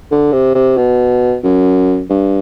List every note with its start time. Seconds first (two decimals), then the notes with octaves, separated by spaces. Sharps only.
0.11 D3
0.33 C3
0.55 C3
0.77 B2
1.43 F#2
2.10 G2